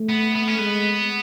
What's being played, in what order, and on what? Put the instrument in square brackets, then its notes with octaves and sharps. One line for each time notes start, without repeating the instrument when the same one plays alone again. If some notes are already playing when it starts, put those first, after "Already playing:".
Already playing: [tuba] A3
[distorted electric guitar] B3
B3
C#4
[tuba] G#3 [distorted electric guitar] B3